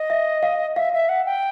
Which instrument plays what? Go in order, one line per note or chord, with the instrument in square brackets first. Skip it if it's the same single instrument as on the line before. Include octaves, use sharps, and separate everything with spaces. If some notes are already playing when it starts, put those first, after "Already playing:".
Already playing: [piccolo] D#5
[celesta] E5
F5
[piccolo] E5 [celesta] F5
[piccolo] E5
F#5
G5